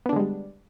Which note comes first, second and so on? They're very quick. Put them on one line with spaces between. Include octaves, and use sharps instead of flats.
B3 D4 D3 G#3 G3